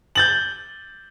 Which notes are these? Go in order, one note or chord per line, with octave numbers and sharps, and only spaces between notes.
G6 A6 F#7